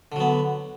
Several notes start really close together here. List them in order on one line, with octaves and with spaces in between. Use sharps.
D3 F#3 B3